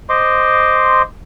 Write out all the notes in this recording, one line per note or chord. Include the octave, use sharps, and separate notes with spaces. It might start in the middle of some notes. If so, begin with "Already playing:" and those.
C5 D#5 C6 D6